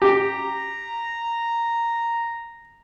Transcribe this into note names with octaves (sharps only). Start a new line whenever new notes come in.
G4 A#5